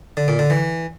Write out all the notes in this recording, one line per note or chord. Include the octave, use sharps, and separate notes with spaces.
D3
A#2
D3
E3